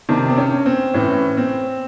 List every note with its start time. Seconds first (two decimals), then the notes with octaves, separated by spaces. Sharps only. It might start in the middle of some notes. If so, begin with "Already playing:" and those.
0.09 C3 D#3 D4
0.30 C4
0.38 C#4
0.66 C4
0.94 A2 E3 C#4
1.37 C4